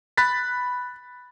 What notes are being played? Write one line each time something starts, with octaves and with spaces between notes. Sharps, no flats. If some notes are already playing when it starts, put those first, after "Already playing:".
B5 F#6 A6 B6